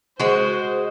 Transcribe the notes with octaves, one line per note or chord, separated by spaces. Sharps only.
G#3 F#4 C5